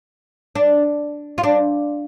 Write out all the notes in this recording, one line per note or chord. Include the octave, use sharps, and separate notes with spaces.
D4
F4
D4